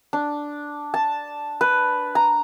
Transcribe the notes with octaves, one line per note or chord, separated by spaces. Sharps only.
D4
A5
B4
A#5